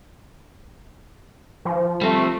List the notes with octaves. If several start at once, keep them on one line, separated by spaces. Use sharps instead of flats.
F3
G3 A3 C4